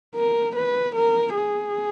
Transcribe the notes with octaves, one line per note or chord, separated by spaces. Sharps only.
A#4
B4
A#4
G#4